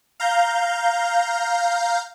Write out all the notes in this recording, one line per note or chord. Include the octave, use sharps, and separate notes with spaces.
F5 A#5 G6